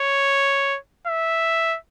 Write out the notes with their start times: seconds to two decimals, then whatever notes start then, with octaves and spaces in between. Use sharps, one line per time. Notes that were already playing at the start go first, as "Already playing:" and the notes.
Already playing: C#5
1.07 E5